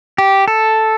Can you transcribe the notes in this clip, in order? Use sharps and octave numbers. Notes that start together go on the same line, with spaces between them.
G4
A4